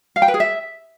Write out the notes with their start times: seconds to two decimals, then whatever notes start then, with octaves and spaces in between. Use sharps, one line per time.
0.16 F5
0.22 G5
0.28 B4
0.34 G#4
0.40 E5